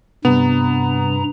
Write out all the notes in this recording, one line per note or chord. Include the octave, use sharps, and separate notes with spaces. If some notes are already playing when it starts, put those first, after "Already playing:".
G2 C3 G3 B3 A#5